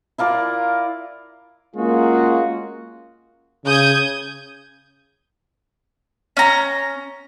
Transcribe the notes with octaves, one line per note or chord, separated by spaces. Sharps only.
E4 F4 A#4 D5
G#3 A#3 C#4 F4 F#4 G#4
C#3 D#6 G6 G#6
C#4 A#5